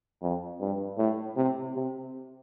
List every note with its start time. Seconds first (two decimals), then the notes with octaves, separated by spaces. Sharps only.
0.21 F2
0.60 G2
0.98 A2
1.36 C3
1.75 C3